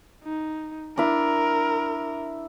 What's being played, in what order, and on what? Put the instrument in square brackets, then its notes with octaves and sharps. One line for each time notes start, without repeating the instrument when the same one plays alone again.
[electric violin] D#4
[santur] D4 E4 [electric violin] A#4